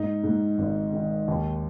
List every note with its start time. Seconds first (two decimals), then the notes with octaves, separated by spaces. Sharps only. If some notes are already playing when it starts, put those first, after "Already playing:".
Already playing: G#2 D#4
0.24 G#2
0.58 G#1
0.92 D#3
1.28 D#2